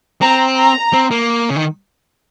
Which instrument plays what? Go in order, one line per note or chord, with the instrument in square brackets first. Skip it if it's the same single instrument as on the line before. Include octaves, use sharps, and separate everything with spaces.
[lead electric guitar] C4 [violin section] A#5
[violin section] A#5
[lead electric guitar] C4
A#3
C#3
D#3